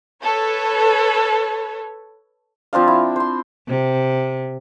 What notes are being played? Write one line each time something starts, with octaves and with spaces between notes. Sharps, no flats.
A4 B4 C#5
F3 C4 D4 F5
E4
C5 C6
C3